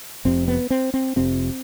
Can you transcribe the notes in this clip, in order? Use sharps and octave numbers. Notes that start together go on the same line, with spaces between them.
F1 F2 C3 C4
B3
C4
C4
F1 F2 C3 C4